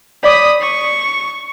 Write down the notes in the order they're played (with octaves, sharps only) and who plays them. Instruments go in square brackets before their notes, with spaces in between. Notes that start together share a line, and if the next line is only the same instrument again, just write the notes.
[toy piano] C#5 D5 D6 [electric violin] B5 D#6
[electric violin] C#6